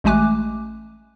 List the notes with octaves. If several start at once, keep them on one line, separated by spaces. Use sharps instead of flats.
A1 G#3 A3 G#5 D6 F#6